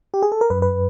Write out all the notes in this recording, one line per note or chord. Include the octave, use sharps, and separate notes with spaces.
G4
G#4
A4
A#4
F#2 B4
B4